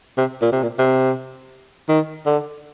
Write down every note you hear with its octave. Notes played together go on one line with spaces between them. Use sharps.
C3
A#2
C3
A#2
C3
D#3
D3